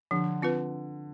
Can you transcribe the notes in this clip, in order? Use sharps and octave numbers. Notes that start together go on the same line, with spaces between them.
D3 F3
C4 F4 B4